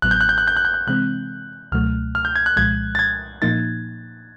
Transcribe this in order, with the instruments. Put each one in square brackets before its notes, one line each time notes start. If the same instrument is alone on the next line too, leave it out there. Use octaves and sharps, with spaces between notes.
[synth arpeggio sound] A1 A2 F#3 B3 [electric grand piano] F#6
[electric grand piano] G6
F#6
G6
F#6
G6
F#6
G6
F#6
[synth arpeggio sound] C3 E3 G#3 C4 [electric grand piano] F#6
[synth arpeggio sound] C#2 B2 F#3 A3 [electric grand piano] F6
[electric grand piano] F6
G6
G#6
F#6
[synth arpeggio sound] C2 A#2 F3 G#3 [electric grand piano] G#6
[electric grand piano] A6
G#6
[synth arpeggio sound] A#2 F3 A#3 D#4 [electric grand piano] A6